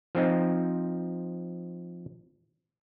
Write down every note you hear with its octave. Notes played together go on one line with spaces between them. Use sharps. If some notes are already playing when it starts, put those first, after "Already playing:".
F3 C4 D#4